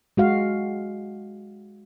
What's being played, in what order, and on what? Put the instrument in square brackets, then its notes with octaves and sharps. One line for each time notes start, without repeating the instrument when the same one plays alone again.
[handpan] G#3 F#4 F5